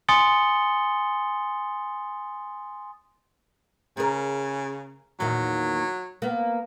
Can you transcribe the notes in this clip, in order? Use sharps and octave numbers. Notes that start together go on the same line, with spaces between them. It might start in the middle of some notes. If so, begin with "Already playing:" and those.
G#5 C6 D#6 A6 C#7 G7
C#3 G#4 A#4
E2 A#2 D#3 F#3
A#3 B3